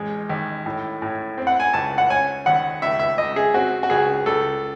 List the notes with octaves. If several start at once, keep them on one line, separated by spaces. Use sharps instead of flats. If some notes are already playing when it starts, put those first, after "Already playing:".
Already playing: A1 G#3
D#2
A2
A2
C4
F#5
G#5
C#2 A5
F#5
C#4 G#5
D#2 F#5
C#2 E5
E5
C#2 D#5
G#4
C4 F#4
F#4
C#2 G#4
C#2 A4